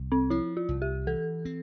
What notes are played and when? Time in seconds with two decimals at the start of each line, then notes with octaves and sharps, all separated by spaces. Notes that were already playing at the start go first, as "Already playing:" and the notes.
Already playing: C2
0.12 C4
0.30 F3 E4
0.57 F4
0.69 C2
0.82 G4
1.07 E3 A4
1.45 C4